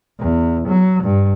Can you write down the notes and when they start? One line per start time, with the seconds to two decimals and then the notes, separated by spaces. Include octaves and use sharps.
0.19 E2
0.68 F#3
1.03 G2